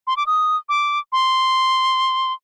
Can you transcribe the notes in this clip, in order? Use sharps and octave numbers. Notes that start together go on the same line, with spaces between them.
C6
D6
D#6
D6
C6